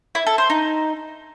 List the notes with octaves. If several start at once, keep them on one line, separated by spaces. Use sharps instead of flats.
E4
A4
C5
D#4